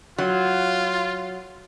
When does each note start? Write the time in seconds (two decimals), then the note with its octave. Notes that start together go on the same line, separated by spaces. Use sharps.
0.18 F#3 F4